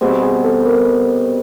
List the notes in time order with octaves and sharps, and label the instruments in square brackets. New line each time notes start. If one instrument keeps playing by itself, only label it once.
[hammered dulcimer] B2 G3 C4 [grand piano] G#4
[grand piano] G#4
A4
A#4